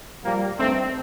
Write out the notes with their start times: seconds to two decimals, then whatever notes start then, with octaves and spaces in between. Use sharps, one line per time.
0.24 A#2 F3 G3 A#3
0.58 G2 D#3 A3 C4